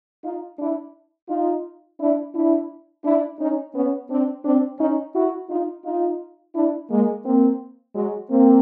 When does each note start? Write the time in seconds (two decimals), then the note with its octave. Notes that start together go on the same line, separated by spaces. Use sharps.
0.24 D#4 F4
0.59 D4 E4
1.29 D#4 F4
1.99 D4 E4
2.34 D4 E4
3.04 D4 E4
3.39 C#4 D#4
3.74 B3 C#4
4.09 C4 D4
4.44 C4 D4
4.79 C#4 D#4
5.15 E4 F#4
5.49 D#4 F4
5.84 D#4 F4
6.54 D4 E4
6.90 G#3 A#3
7.24 A#3 C4
7.95 F#3 G#3
8.30 A#3 C4